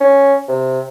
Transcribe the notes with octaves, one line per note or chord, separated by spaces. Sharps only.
C#4
C3